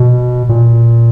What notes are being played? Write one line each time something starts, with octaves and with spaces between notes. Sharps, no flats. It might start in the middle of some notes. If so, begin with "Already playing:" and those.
Already playing: B2
A#2